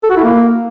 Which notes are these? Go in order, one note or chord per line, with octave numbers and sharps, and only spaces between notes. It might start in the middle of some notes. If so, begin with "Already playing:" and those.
A4
F#4
E4
A#3